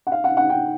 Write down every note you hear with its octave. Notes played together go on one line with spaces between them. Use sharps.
F#5
F5
F#5
F#5
G5